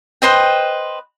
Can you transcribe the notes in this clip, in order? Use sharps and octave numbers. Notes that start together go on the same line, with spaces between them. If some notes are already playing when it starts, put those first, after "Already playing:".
B4 C5 D#5 G5